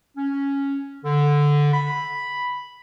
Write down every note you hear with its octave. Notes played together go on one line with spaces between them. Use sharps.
C#4
D3
B5